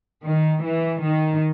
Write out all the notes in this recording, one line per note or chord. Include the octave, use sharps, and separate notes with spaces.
D#3
E3
D#3